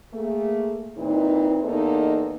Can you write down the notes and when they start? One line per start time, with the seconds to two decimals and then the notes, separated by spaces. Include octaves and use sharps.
0.13 A3 A#3 G#4
0.97 A#2 E3 C4 D#4
1.64 E2 A#3 B3 D#4 A4 D#5